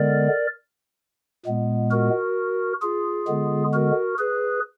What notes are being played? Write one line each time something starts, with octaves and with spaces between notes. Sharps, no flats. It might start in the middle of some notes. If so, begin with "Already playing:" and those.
Already playing: D3 G#3 B3 A#4 D5
A#2 G#3 B3
F#4 A#4
F4 G#4
D3 G#3 B3
F#4 A#4
G#4 B4